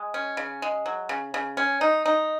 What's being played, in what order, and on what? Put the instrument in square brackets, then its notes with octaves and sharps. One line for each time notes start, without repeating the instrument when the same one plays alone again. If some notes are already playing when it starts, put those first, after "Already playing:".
Already playing: [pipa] G#3
C#4
C#3
G#3
F#3
C#3
C#3
C#4
D#4
D#4